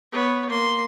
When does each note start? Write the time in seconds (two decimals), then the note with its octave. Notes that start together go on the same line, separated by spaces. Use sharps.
0.12 B3 C#5
0.49 A#3 C6